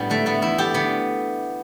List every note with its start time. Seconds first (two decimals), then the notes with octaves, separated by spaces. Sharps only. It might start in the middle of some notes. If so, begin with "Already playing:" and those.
Already playing: A2 G3 B3 D4
0.10 D3 A3
0.26 A3 B3
0.42 E2 E4
0.58 A3 G4
0.74 D3 B3